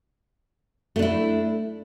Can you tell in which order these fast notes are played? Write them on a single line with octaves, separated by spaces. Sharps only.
A3 D4 E4